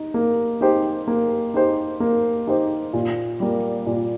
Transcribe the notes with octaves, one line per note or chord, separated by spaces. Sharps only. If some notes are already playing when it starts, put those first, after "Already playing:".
Already playing: D#4
A#3
D#4 G4 C5
A#3
D#4 G4 C5
A#3
D#4 G4 C5
A#2
G3 A#3
A#2